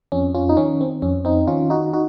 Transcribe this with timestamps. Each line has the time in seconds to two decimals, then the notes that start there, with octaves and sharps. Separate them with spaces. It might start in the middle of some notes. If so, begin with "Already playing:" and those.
0.12 F2 C#4
0.34 C#4 F4
0.49 D#4
0.57 D#3 C#4
0.81 C4
1.02 F2 C#4
1.25 C4 D#4
1.47 D#3 C#4 F4
1.70 D#4 F#4
1.93 D#4 F#4